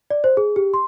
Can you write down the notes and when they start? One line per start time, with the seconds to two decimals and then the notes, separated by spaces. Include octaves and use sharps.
0.10 D5
0.24 C5
0.37 G#4
0.56 G4
0.74 C6